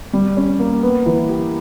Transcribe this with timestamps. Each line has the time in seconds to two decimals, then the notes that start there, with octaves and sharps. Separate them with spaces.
0.13 G3
0.37 C#4
0.60 A#3
0.82 B3
1.06 E3
1.29 G4